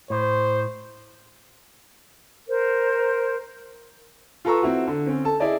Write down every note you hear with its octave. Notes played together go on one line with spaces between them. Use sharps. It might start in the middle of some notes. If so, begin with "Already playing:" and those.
A2 C5
A#4 C5
F4 A4 B4 A#5 C#6 E6
C4 E4 F#4
D3
C4 C#4
A4 A5
E4 G#4 D5 D#5